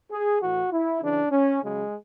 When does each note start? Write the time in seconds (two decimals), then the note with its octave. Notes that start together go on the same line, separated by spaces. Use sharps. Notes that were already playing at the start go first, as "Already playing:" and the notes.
0.11 G#4
0.41 A2 E3 F#4
0.72 E4
1.02 C#3 E3 D4
1.31 C#4
1.61 C#3 F#3 G#3